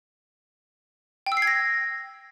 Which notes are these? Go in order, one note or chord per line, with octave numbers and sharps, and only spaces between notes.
G5
E6
C7
G#6
A#6